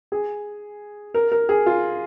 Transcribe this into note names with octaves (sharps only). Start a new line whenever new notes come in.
G#4
A#4
A#4
G#4
F4